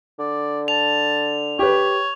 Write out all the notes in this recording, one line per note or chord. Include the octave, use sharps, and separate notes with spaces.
D3 D5
A5 F7
G4 B4 C#5